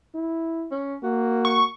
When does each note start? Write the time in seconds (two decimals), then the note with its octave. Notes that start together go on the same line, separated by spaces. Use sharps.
0.15 E4
0.71 C#4
1.03 A#3 F#4
1.45 C#6